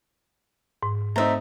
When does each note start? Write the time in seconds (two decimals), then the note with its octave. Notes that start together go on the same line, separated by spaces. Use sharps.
0.83 G#2
1.16 A3 C4 D#4 E5 A#5